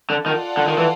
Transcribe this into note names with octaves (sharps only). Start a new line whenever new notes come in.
D3
D#3 F4 A4 D5 F#5
D3
D#3
E3